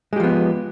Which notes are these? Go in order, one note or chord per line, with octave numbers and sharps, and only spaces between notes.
F3 G#3 B3 G4